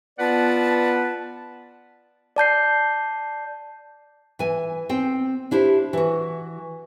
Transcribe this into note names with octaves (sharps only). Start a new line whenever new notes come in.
B3 F4 B4 D5 F#5 A5
D5 A5 G6 C7
E3 G#5
C4 G5
D4 E4 G4 C5
E3 F#4